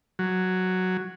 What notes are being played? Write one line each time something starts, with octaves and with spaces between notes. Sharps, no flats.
F#3